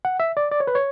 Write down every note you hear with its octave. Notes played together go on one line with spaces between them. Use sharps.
F#5
E5
D5
D5
C#5
B4
C#5